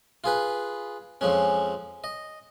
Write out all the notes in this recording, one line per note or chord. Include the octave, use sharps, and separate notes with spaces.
F4 G#4 B4
F2 F3 G#3 C#4
D#5